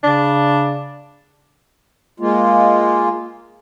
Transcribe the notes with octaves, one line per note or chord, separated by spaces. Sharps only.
C#3 D4
G#3 A#3 F4